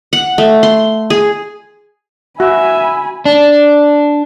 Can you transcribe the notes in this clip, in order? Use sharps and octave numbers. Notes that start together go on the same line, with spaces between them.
F#5
A3
C6
G#4
F#4 E5 G#5 B5
D4